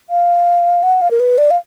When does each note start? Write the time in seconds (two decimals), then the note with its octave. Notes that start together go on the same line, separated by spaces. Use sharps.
0.10 F5
0.83 F#5
1.01 F5
1.11 A#4
1.20 B4
1.38 D5
1.51 F5